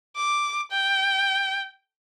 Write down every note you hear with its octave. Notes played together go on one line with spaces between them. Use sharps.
D6
G5